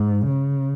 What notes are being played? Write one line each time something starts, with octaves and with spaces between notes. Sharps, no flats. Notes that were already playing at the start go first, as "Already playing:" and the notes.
Already playing: G#2
C#3